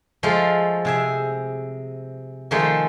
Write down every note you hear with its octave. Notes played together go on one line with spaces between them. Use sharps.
F3 G#3 A3 A4 D#5 F5
C3 G#4 E5
D#3 F3 G#3 A3 D#4 G#4